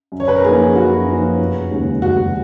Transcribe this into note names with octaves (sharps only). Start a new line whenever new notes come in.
F#2
C#5
B4
A#4
F3 A#3 D#4 G#4
F#2 F#4
F3 A#3 D#4
F1
D#2 C#3 G#3
F1 F#4